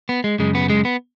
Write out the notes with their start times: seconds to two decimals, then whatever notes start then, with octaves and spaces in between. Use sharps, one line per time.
0.09 B3
0.24 G#3
0.39 F#2 C#3 G#3
0.55 B3
0.70 G#3
0.85 B3